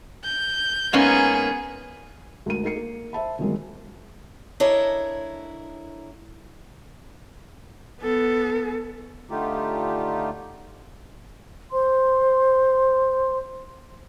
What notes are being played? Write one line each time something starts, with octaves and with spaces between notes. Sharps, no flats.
G6
G#2 A#3 B3 C#4 G#4
D2 G#2 A#4 D#7
D#4 A#4 C7 C#7
A#3 A#4
C5 E5 A5 B5
G1 D#3 F#3 G#3 C4 A#4
D4 E4 A4 A#4 C#5 D#5
B3 A4
D3 A3 D#4 F4 G4
C5 C6